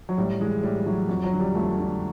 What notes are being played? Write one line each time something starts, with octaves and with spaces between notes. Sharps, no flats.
F#3
A2 G3
E3 G#3
A2 G3
E3 F#3
F2 F#3
F#3
D3
G3
F2 A3
D3